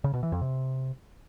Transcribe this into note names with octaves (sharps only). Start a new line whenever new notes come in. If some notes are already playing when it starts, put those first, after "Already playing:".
C#3
B2
E3
F2
C3